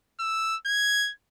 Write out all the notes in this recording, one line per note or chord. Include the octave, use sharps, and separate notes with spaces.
E6
G#6